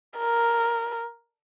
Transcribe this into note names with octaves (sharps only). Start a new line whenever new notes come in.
A#4